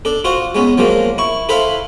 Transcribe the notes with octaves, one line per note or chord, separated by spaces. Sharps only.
D4 A4
F4 F#4 C5 F#5
G#3 B3 C#4
F3 F#3 G#3 A#3
E4 C#6
E4 A4 B4 C5 E5 F5